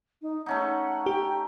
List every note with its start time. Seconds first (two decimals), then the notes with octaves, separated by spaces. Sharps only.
0.22 D#4
0.46 A3 C#4 D#4 F#5
1.06 G4 G5